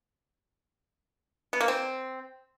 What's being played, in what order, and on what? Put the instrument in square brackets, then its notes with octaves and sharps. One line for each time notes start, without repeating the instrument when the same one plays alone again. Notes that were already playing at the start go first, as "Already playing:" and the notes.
[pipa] B3
A#3
C4